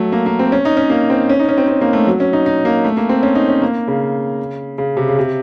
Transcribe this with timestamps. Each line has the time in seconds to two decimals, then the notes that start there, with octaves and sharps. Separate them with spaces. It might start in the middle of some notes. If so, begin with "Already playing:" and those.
Already playing: F#3 A3
0.12 A#3
0.26 A#3
0.39 C4
0.52 C#4
0.65 D#4
0.77 C#4
0.90 A#3
1.10 C4
1.30 C#4
1.39 D#4
1.49 C#4
1.58 C4
1.68 C4
1.81 A#3
1.93 A3
2.07 F#3
2.20 C#4
2.33 D#4
2.46 D#4
2.65 A#3
2.84 A3
2.97 A#3
3.09 C4
3.23 C#4
3.35 D#4
3.49 C#4
3.62 A#3
3.88 C#3
4.78 C#3
4.97 C3
5.08 C#3
5.19 C3